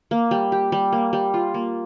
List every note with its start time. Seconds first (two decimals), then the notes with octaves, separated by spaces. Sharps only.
0.11 A#3
0.31 G3
0.52 G4
0.72 G3
0.93 A#3
1.13 G3
1.34 F4
1.54 A#3